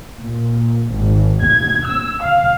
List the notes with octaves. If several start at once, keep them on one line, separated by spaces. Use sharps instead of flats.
A#2
G#1
G#6
E6
F5